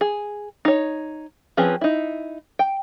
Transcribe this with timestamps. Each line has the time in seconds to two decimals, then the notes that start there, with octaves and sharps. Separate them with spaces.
0.01 G#4
0.65 D#4 C#5
1.57 F3 C4 C#4 G#4 B4
1.81 D#4 E4
2.59 G5